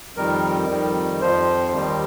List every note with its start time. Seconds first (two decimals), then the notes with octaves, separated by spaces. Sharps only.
0.17 F2 D#3 G3 A#4
0.69 F2 D#3 G3
1.21 F2 F3 C5
1.74 D#2 D#3 G3